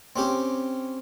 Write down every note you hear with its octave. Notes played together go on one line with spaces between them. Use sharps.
C4 C#4 G4